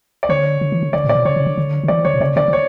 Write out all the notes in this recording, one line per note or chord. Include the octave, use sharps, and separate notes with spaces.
D5
D3 C#5
D3
E3
D3
D3 D5
A#2 D5
B2
C#3 C#5
C#3
D3
D3
D3
E3 D5
D3 C#5
B2
C#3 D5
D3 D5
D3
C#5